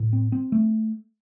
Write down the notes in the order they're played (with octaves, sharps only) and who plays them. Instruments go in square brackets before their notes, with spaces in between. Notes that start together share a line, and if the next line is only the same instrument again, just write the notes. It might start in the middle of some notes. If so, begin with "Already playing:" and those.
Already playing: [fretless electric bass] A2
C4
C4
A3